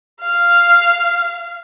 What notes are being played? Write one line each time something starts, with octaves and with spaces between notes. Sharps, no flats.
F5